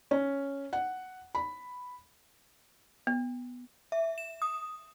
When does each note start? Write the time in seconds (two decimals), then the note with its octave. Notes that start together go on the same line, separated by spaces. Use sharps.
0.11 C#4
0.73 F#5
1.35 B5
3.07 B3
3.92 E5
4.18 E7
4.42 D#6